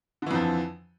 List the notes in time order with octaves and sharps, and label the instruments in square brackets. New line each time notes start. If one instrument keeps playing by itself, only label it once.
[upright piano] D3
E3
F2
F3